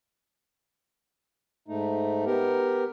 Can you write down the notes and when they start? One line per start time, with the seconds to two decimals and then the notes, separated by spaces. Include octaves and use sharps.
1.68 G#2 A3 D#4
2.26 B3 G4 A#4